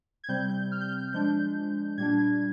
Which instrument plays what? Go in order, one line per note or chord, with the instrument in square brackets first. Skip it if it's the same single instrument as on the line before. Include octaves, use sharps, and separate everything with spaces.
[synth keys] G#6
C3 G3 C4 G6
G6
F6
G6
G6
F3 G#3 D4 G6
A#2 G3 D4 G#6